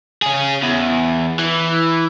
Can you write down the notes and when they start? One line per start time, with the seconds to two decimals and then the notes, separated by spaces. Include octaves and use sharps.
0.22 C#4 G#4
0.63 E2
1.39 E3